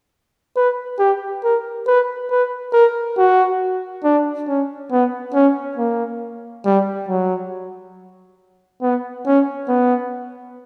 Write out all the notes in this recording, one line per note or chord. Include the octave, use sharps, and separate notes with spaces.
B4
G4
A#4
B4
B4
A#4
F#4
D4
C#4
B3
C#4
A#3
G3
F#3
B3
C#4
B3